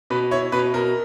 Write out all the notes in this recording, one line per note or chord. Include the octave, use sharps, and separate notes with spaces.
B2 B4
E4 C#5
B2 B4
B2 A#4